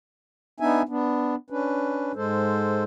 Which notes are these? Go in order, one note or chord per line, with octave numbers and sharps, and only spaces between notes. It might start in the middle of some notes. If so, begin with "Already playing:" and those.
B3 D4 D#4 E5 G#5
B3 D4
C#4 D4 B4
G#2 G#3 A4 C5